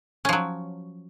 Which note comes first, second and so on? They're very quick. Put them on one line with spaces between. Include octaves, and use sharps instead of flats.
C#4 F3 F#3